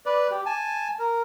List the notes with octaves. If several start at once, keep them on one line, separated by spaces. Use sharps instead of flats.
B4 D5
G4
G#5 A5
A#4